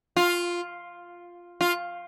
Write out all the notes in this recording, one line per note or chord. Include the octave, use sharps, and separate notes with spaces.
F4
F4